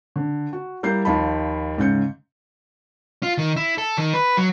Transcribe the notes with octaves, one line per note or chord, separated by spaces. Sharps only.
D3
F#4
G3 A#3 E4 A#5 G6 C7
D#2 F3 D#4 F4 A5 B5
G#2 C#3 G6 C#7
F4
D#3
E4
A4
D#3
B4
F#3